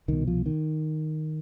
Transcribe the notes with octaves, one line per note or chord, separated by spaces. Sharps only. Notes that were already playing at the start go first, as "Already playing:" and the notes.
C2 B2 D#3
F3
D#3